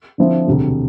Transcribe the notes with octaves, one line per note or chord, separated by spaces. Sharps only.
D3 F3 C4 E4
E1 D2 C3